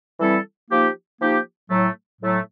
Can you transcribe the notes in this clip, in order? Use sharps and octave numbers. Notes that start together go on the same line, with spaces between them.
E3 G3 C4 E4 A4
F3 A#3 D#4 G4
F3 A#3 D#4 G4
A2 F#3 A3
A2 F#3 A3